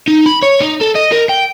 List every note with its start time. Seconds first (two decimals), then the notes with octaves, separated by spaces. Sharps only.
0.08 D#4
0.26 B5
0.43 C#5
0.61 D#4
0.81 A4
0.96 D#5
1.12 A#4
1.29 G5